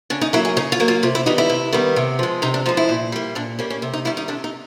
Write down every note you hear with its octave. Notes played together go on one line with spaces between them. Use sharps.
C#3 D4
D#4
F#3 A#3 E4
G#4
C#3 D#4
F4
F#3 A#3
F4
C3 F4
E4
D#3 G3 B3 D#4
E4
C3
D#3 G3 B3
C3
F3 G#3
C3 D#4
D4
F3 G#3 D#4
E4
A#2
G3 A#3
A#2 D4
G3 A#3 C#4
C#4
C3
D#4
D#3 G3 E4
D#4
C3 D4
D#4